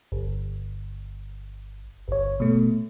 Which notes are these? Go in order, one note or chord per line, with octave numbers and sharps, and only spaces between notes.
G1
G1 C#5
B2 A3